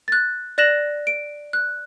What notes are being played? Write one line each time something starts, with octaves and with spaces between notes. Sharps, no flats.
F#6 A6
D5 F#6 A#6 E7 F#7
D7
F#6